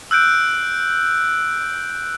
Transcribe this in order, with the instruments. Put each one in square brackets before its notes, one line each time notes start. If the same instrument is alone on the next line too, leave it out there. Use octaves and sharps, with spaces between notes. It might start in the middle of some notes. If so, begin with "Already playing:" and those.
[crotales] E6 F#6 G6 D7